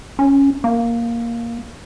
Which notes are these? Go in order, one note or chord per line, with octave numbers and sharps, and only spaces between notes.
C#4
A#3